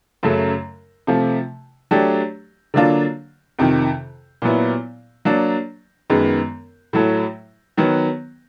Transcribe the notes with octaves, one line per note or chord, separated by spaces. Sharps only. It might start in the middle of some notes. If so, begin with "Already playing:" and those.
F#2 C#3 F#3 A3
C3 F3 A3
F#3 A3 D4 G4
D3 F#3 A#3 D4 F4
F2 C3 D#3
A#2 F#3 B3 E4
F#3 A#3 D4
F#2 D#3 G#3 B3
A2 F#3 A3
D#3 F#3 B3